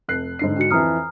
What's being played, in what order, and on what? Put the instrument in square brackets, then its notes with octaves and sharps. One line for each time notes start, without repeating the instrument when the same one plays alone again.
[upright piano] F1 F#6 C7
G#2 D3 C7
[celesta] D4 F#4 C#7
[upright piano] F2 E3 [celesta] A#5 D#6 F6